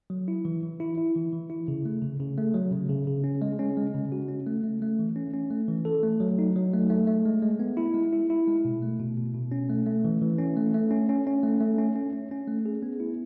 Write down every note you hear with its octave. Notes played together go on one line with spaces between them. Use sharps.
F#3
E4
E3
E3
E4
E4
E3
E3
E4
C#3
A3
C#3
C#3
A3
F#3
C#3
C#3
C#3
C#4
G#3
C#4
G#3
C#3
F#4
C#4
A3
A3
A3
E3
C#4
C#4
A3
E3
A4
A3
F#3
D#4
F#3
A3
A3
A3
G#3
G#3
B3
E4
G#3
E4
E4
G#3
B2
A3
B2
B2
B2
C#4
A3
A3
E3
E3
C#4
A3
A3
C#4
C#4
C#4
A3
A3
C#4
C#4
C#4
C#4
A3
G#4
B3
E4